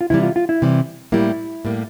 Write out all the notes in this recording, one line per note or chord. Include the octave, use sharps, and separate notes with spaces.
F4
C3 E3 G3 E4
F4
F4
E4
C3 E3 G3
A2 G3 A#3 E4
A2 G3 A#3